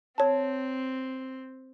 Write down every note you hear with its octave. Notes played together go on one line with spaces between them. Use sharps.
C4 C#5 A5